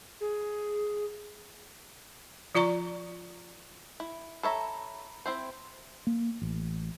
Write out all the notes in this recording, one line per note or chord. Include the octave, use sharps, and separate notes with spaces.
G#4
F3 F4 D5 A#5 C#6
E4
A4 C#5 E5 A#5 B5
C4 E4 C5
A#3
A1